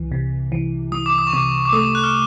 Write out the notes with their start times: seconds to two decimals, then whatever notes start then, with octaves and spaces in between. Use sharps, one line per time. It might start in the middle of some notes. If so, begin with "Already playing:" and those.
Already playing: C2 E3
0.12 C3
0.52 E3
0.92 E3 D#6
1.06 D6
1.18 D#6
1.27 C#6
1.33 C3 D6
1.65 D6
1.73 A3 D#6
1.95 F#6
2.04 F6